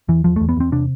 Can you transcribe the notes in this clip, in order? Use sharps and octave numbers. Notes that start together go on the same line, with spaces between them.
E2 E3
E2 F3
A3
E2
B3
E2 C4
C3 D4